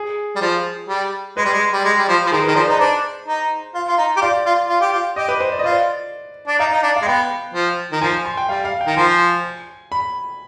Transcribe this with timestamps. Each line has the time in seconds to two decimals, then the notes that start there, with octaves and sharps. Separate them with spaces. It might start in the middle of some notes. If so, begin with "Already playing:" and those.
Already playing: G#4
0.36 G3
0.41 F3
0.89 G3
1.37 G#3 B4
1.45 G3
1.53 G#3
1.73 G3
1.85 G#3
1.98 G3
2.08 F3
2.27 F3
2.31 D#3 G#4
2.44 B4
2.48 D#3
2.55 F3 D5
2.67 D#4 B4
2.79 D4 C5
3.27 D#4
3.74 F4
3.88 F4
3.98 D#4
4.17 G4
4.21 F4 D5
4.46 F4
4.69 F4
4.81 G4
4.92 F4
5.16 G4 D#5
5.29 B4
5.41 C5
5.52 D5
5.59 D#5
5.64 F4 D5
6.47 D4
6.58 D#4 F5
6.73 D#4
6.83 D4
6.96 F5
7.02 G#3
7.06 B3 G5
7.54 F3
7.92 D#3
8.02 F3 G#5
8.25 C6
8.37 G5
8.49 G3 F5
8.65 F5
8.81 G5
8.87 D#3
8.96 F3 G#5
9.92 B5